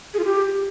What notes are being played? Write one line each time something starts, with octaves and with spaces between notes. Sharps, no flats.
G#4
F4
G4